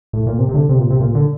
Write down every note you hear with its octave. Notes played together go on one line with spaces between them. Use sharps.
A2
A#2
C3
C3
D3
C3
A#2
C3
A#2
D3